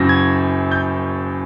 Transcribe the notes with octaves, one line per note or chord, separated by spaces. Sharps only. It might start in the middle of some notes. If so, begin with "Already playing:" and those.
Already playing: F#1 F#2 C#3 F#3 A#6
G#6
G6